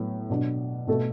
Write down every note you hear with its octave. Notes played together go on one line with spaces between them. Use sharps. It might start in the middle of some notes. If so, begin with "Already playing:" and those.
Already playing: A2 F#3 B3
B2 F#3 D4
B2 A3 F#4 A4